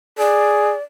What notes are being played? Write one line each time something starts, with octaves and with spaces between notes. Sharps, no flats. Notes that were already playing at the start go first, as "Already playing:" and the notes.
G#4 D5